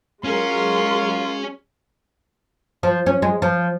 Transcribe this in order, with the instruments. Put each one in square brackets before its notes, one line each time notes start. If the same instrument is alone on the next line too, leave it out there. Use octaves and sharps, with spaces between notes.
[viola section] F#3 G#3 G#4 [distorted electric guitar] C#4 [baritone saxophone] F4 [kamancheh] A#4 C6
[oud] F3
C#4
G#3
F3